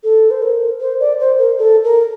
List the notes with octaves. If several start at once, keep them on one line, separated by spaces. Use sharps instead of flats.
A4
C5
A#4
C5
D5
C5
A#4
A4
A#4